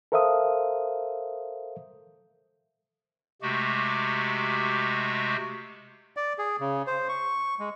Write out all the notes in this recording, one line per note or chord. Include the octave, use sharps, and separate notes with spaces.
A4 A#4 C5 E5 F5 D#6
C3 G#3 A3 F#4 G4
D5
G#4
C#3
C5
C#6
G#3